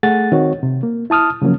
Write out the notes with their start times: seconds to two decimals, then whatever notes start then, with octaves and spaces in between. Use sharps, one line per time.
0.03 A3 G#4 F#5 A6
0.32 D#3 C4 F#4 C#5
0.63 C3
0.83 A#3
1.10 E4 A5 D#6 F6
1.42 C#3 F3 F#3 A#3 C#4